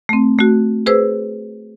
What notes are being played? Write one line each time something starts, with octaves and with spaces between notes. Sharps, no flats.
A3 C4
A3 F#4
G#4 B4 C5 E6